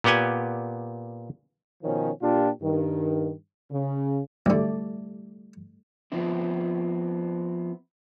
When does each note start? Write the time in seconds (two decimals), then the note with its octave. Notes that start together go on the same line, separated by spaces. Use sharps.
0.04 A#2 B3 G4 F#5 G#5
1.83 B2 D#3 F3 C#4
2.22 A#2 D4 F4 G4
2.62 G2 D#3
3.72 C#3
4.46 B1 D3 G3 A3 D5
6.12 F3 B3 C4 E4